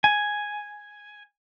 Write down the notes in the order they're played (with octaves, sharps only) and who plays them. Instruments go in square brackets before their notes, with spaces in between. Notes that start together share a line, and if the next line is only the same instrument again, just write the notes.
[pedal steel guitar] G#5